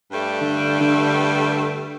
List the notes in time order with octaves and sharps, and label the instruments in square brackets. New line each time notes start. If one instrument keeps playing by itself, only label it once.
[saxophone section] G2 G3 A3
[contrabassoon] D3
D3